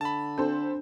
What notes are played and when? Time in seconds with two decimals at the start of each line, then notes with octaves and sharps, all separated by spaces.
0.01 D3 A5 B5
0.38 C4 D4 A4 C5